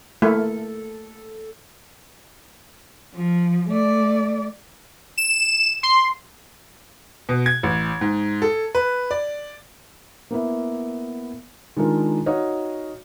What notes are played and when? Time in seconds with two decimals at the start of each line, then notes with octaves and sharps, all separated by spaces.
0.22 A3 A#3 E4 A4
3.15 F3
3.70 A3 D5
5.18 E7
5.83 C6
7.29 B2
7.46 G#6
7.63 A1
8.01 G#2
8.42 A4
8.75 B4
9.11 D5
10.31 A#3 B3 E4
11.77 D#3 G#3 D4 F4 A#4
12.26 D#4 F#4 C#5 D#5 F5